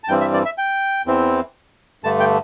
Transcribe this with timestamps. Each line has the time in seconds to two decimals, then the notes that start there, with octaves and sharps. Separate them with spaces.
0.04 A5
0.08 G2 E3 G3 C4 G5
0.21 E5
0.34 D5
0.45 E5
0.58 G5
1.06 E2 E3 C4
2.04 G2 D3 A3 A5
2.20 G5